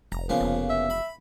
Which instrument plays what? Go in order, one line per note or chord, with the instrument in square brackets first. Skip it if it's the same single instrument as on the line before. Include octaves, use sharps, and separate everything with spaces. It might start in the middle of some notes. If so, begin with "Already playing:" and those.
[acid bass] F1 [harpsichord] A#5
[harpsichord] C#3 A#3 B3 [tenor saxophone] F3
[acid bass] F1
[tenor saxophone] E5
[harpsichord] B5